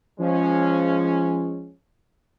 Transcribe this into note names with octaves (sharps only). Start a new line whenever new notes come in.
F3 G#3 C#4